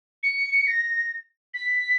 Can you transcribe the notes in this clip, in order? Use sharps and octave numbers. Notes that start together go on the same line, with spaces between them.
C#7
A#6
B6